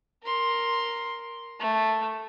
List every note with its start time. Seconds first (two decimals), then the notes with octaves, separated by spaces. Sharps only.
0.24 A#4 C6
1.60 A3